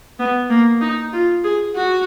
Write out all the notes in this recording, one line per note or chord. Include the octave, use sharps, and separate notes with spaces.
B3
A#3
D#4
F4
G#4
F#4